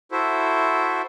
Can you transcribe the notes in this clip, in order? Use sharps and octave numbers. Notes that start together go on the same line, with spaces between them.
E4 F#4 A4 C5 E5